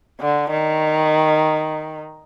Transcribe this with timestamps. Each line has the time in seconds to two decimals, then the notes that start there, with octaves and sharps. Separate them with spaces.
0.20 D3
0.51 D#3